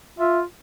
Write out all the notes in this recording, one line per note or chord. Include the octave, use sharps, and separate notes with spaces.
F4 E5